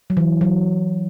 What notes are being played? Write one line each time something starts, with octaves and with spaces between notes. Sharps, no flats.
F#3
E3
F#3